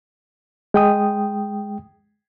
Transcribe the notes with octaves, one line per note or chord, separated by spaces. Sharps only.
G#3 G5 D#6